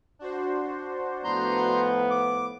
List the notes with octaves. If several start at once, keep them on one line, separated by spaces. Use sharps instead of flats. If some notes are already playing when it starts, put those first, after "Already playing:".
D4 F#4 C5
A2 F3 B3 A#5 C6 G6
D6